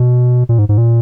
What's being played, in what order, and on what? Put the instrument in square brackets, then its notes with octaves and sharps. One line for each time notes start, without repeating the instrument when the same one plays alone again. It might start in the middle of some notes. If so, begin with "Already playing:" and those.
Already playing: [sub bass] B2
A#2
G#2
G#2
A#2